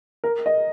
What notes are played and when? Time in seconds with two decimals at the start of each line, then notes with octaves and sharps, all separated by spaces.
0.24 A#4
0.46 D#5